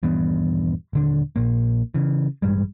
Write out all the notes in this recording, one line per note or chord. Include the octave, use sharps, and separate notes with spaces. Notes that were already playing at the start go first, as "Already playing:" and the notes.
D#1 G2 E3 B3
D#1 D3 D4
A#1 A#2 A#3
C#3 E3
A1 G2 G3 G#3